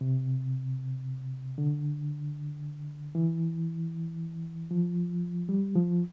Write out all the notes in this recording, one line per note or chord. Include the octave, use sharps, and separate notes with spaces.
C3
D3
E3
F3
G3
F3